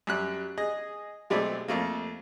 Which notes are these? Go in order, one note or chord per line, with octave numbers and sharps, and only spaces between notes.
F#2 G3 F#6
G#4 D#5
B1 G#3 A3 C4 D5 B5
F2 A3 A#3